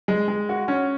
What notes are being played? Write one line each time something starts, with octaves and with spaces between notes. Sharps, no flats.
G#3
G#3
F#4
C#4